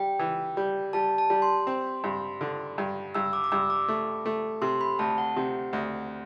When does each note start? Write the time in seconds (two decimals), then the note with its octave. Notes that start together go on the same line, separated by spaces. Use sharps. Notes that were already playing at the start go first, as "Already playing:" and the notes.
Already playing: G3 G5
0.19 E3
0.57 G3
0.93 G3 A5
1.18 A5
1.30 G3
1.42 C6
1.67 C4
2.04 G2
2.41 D3
2.78 G2
3.15 G2 E6
3.33 D6
3.44 D6
3.52 G2 E6
3.70 D6
3.88 A3
4.26 A3
4.62 C3 C6
4.81 B5
4.99 D2 A5
5.18 F#5
5.36 C3
5.73 D2